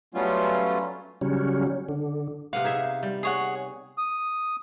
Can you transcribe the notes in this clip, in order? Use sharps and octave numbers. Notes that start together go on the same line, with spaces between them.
F#3 G3 A3 B3 C#4 F4
C#3 F#3 G3 C#4
D3
C3 B3 F5 F#5
D#4 G#4 E5
G3
G#4 C#5 F#5
D#6